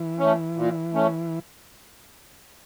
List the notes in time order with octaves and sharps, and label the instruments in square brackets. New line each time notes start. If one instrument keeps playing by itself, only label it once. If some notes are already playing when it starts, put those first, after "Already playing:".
Already playing: [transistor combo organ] E3
[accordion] A3 C#4
A#2
A3 C#4